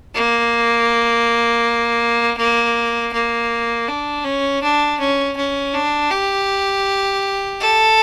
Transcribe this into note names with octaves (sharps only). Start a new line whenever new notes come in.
A#3
A#3
A#3
D4
C#4
D4
C#4
C#4
D4
G4
A4